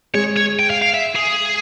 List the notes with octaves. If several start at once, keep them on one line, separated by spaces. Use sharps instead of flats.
G#3 C#5
C#5
G5
F5
F5
E5
G#4